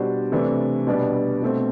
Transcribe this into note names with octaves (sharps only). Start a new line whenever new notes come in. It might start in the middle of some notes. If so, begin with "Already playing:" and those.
Already playing: B2 G3 D4 F#4 C5
C3 E3 A3 D4
B2 G3 B3 D4 G4
B2 A3 C4